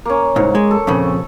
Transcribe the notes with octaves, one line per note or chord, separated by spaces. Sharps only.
A#3 C#4
C2 G#2 C#5
G#3
A4
F2 A#2 C#3